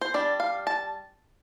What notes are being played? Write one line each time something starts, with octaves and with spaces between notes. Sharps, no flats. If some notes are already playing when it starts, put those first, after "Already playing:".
C5
G3 D4 D5
F5
A5